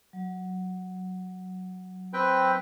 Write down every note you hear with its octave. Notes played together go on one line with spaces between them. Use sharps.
F#3
C4 B4 G5